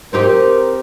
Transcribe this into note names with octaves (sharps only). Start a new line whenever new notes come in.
C4 D#4 G4 A#4